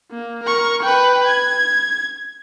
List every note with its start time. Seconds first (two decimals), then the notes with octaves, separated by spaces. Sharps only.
0.11 A#3
0.44 A#4 C#6
0.83 B4 G5
1.27 G#6